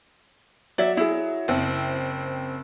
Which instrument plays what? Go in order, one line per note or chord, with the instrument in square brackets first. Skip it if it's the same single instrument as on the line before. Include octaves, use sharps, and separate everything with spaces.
[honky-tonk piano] F#3 [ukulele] D5 E5
[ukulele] E4 G#4
[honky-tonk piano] F#1 C4